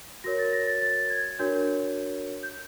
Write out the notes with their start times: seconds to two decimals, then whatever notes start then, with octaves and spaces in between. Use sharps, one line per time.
0.24 F#4 A#4 C#5 A#6
0.39 A6
0.53 A#6
0.67 A6
0.81 A6
1.10 G#6
1.39 D4 F#4 A#4 C#5 G6
2.43 G6